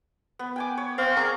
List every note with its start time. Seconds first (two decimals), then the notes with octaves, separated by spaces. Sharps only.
0.39 B3
0.56 G5 G#5 D6
0.78 C#5
0.98 C4 F5
1.17 G#4 A#4 D5 C#6